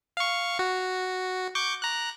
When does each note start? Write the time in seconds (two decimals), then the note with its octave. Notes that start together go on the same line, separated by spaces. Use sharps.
0.17 F5 C#6
0.59 F#4
1.55 C#6 D6 G6
1.82 A#5 F#6